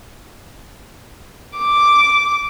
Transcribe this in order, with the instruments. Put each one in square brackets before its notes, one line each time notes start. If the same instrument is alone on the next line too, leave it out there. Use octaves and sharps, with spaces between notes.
[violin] D6